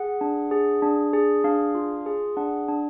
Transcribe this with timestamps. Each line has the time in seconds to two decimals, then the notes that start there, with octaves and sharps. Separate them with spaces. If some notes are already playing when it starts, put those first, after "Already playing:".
Already playing: G#4 F#5
0.21 D4
0.51 G#4
0.82 D4
1.13 G#4
1.44 D4 F5
1.75 F4
2.06 G#4
2.37 D4 F#5
2.68 D4